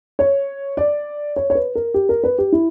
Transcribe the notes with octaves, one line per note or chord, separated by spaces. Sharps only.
C#5
D5
C#5
C#5
B4
A#4
G4
A#4
B4
G4
E4